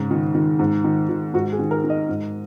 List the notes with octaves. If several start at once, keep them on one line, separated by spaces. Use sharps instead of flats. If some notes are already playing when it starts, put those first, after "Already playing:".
Already playing: G#2 C#3
D#3
D#3
G#2
D#3
D#3
G#2 F#4
G#4
D#3
A#4
D#3
D#5
G#2